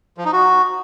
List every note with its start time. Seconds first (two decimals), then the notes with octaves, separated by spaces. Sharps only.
0.18 F3
0.25 D#4
0.33 F#4